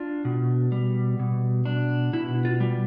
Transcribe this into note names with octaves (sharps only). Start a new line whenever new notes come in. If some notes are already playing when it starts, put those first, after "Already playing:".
Already playing: D4 F4
B2
G3
B2
D4
B2 E4
F4
G3